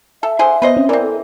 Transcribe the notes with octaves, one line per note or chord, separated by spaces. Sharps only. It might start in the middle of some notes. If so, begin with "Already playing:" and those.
A4 E5
D3 G#4 C5
B3 B4 C5 D#5
C4 C#4
E3 C4 A#4 D5
A4